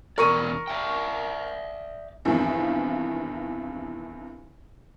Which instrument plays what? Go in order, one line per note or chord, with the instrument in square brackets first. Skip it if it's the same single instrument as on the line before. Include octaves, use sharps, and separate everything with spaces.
[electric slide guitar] E2 B2 D5 [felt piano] A#4 C#6 D#7
[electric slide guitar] D5 E5 G5
[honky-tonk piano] B1 E2 G2 C3 D#3 F3